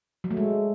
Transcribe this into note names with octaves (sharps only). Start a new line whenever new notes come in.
F#3
A3
G#3